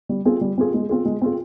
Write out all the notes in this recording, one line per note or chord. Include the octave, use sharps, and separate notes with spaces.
G3
C4 F4 G#4
G3
C4 F4 G#4
G#3
C4 F4 G#4
G#3
C4 F4 G#4